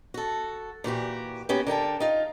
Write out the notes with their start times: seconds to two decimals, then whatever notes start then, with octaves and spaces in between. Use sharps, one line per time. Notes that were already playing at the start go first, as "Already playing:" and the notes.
0.14 F#4 A4
0.84 A#2 E3 F#4 G4
1.49 A#3 B3 C#4 F#4 G4
1.67 D3 A#4 G5 A5
2.00 D#4 F4